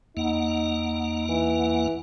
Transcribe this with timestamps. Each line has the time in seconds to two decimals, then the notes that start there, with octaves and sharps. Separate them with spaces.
0.17 E2 A#3 D#4 F#5
1.29 E3